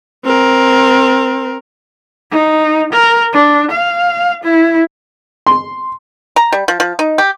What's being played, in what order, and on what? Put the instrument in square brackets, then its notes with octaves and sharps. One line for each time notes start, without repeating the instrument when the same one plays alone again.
[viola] C4 A#4
[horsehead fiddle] D#4
A#4
D4
F5
E4
[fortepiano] C6
[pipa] A#5
G3
F3
F3
D#4
G4